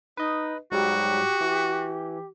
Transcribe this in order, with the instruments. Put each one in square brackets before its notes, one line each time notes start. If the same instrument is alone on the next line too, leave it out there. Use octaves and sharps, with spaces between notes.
[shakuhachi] D#4 [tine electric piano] B4 D#5
[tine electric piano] G#2 F#3 G3 [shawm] F#4 [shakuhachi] G4
[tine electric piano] E3